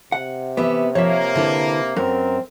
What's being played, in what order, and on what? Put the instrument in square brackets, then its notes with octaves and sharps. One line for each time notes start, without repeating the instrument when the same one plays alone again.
[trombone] C3 [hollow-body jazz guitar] F#5
[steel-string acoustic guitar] E3 G4 E5 [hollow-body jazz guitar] B3
[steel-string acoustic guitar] F3 [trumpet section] A#3 [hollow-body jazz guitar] C#5 E5
[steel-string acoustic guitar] D3 E4 B4
[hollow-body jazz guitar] F#2 [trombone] C4 [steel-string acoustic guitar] A#4